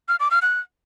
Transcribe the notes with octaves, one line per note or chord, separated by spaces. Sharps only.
F6
D6
F6
F#6